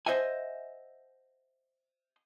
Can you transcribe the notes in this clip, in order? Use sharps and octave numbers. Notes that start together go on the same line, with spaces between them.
C5 D#5 E5 F#5 G#5